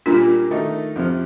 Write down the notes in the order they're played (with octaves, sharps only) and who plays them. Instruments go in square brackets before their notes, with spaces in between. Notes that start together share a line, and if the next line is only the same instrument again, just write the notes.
[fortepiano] A#2 G3 A#3 [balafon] D4 F4
[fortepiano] D#3 A3 D#4
F2 C3 F3